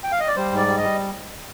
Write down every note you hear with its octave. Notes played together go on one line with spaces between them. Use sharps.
G5
F5
D#5
D5
G3 C5
G#2 D5
G3
D#5
G3